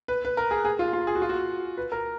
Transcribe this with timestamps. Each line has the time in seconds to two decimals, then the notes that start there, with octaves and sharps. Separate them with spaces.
0.08 B4
0.25 B4
0.37 A#4
0.51 G#4
0.65 G#4
0.79 F4
0.93 F4
1.07 G#4
1.15 F#4
1.22 F4
1.29 F#4
1.77 B4
1.92 A#4